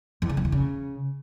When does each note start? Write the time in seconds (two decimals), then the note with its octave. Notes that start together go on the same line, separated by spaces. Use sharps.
0.22 E2
0.29 C#3
0.37 F2
0.45 E2
0.52 C#3